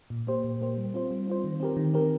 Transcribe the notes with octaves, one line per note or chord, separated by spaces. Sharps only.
A#2
A#3 G4 C5
A#2
A#3 G4 C5
G3
C4 F4 C5
G3
C4 F4 C5
D#3
C4 G4 A#4
D#3
C4 G4 A#4